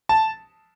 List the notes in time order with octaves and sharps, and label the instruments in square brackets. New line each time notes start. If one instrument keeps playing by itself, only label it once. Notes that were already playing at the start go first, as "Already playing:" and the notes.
[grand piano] A5